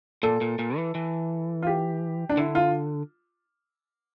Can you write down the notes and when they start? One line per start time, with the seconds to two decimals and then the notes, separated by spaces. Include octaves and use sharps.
0.23 A#2 A4
0.41 A#2
0.59 A#2
0.76 E3
0.95 E3
1.62 F4
1.67 G4
2.29 D4
2.37 D3 E4
2.55 F4